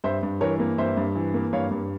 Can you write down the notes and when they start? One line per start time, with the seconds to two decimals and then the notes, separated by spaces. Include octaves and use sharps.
0.04 G2 C5 E5
0.23 G2
0.41 E3 A#4 C#5
0.60 A#3
0.78 G2 C5 E5
0.97 G2
1.15 E3
1.34 A#3
1.53 G2 C#5 F5
1.71 G2